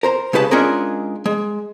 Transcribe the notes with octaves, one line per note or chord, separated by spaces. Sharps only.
A#4 C5 A#5
C#3 G#3 G4 B4 F#5 A5
G#3 C#4 D4 F4 G#4 A#4
G#3